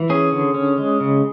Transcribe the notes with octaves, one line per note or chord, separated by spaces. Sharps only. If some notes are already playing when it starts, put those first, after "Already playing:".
Already playing: E3
C#4 G#4
D3
C#4
G#3
C#3